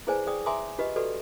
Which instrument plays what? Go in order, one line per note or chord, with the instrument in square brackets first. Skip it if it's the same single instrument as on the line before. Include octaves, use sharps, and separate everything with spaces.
[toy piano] E4 G#4 B4 C5 D5 G#5
G#4 D5 G5 D#6
E5 G#5 A#5 C6 D6 D#6
F4 G4 B4 D#5
F#4 G4 A4 B4 D5